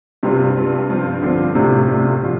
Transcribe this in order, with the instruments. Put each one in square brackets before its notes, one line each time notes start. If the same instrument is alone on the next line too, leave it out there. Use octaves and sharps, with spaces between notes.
[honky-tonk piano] G2 G3 F4 [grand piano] C3
[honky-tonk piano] G2 G3 F4
G2 F3 C4 F4
[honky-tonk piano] G2 F3 C4 F4 [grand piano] D3
[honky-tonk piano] A2 A3 D4 F4 [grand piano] C3
[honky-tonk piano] A2 A3 D4 F4 [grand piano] C3
[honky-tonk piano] D3 F3 D4 F4